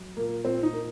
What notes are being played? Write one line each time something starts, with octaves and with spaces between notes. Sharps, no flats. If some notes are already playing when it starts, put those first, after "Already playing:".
Already playing: F#3
A#2 A#3
A#2 C4
D#4
A#3